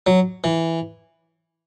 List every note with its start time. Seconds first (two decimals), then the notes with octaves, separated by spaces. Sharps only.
0.07 F#3
0.44 E3